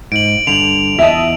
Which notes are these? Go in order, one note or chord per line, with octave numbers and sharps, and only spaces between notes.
G#2 D7 F#7
G2 D3 F7 F#7
E2 D#5 E5 A5